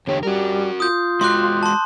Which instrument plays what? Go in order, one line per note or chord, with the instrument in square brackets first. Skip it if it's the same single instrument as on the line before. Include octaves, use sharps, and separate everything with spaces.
[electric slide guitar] E2 D3 G4 [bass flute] C#5
[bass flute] G3 [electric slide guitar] F#4 A#4
[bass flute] F4 [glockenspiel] D#6 G6
[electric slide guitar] G#3 F#4 [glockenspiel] C6 D6 F#6
[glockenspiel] A5 C6